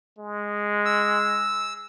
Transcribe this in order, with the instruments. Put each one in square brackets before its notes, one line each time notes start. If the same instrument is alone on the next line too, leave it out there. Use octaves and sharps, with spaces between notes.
[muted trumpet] G#3
[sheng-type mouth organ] E6